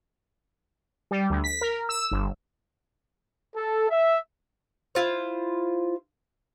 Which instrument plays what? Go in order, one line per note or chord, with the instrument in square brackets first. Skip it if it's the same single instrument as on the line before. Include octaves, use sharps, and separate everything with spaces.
[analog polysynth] G3
D2
B6
A#4
E6
G1
[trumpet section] A4
E5
[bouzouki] E4 F4 C5